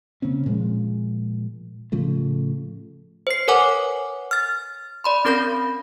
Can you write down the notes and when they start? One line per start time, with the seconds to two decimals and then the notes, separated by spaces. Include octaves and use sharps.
0.22 C#3 A#3 C4 C#4
0.46 A#2 F3 G#3
1.92 A2 C#3 F3 A3
3.27 C5 C7
3.48 A#4 B4 C#5 F#5 G#5 D6
4.31 F6 A6
5.04 D5 B5 C6
5.25 C4 C#4 A#4 B5 G6 A#6